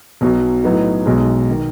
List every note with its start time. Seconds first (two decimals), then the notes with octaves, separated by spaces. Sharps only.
0.21 B1 B2 F#3
0.63 A2 F#3 B3 D#4
1.06 B1 B2 G#3
1.50 D#3